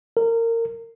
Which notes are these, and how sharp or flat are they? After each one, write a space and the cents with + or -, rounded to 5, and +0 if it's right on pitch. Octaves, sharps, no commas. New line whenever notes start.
A#4 -25